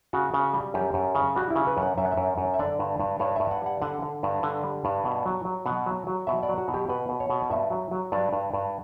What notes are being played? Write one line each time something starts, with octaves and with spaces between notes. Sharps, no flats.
C#3 F#4
C#3
G3
F#2 G4
F#2
C#3
G3 F#4
E4
C#3
B4
F#2
F#5
F#2 E5
F#5
E5
F#2
F#2
E5
D3 D5
G2
G2
G2 C#5
G2 E5
F#5
G3 F#5
D3 F#5
D3
G2
D3
G3
G2
B2
F#3
F#3
B2 F#5
F#3
F#3
B2 E5
D5
F#3
F#4
B2
G4
B2 B4
B2
C#5
B2
G2 E5
F#3
F#3
G2 D5
G2
G2